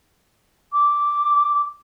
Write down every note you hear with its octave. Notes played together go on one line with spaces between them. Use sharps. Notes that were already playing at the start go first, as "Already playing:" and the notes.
D6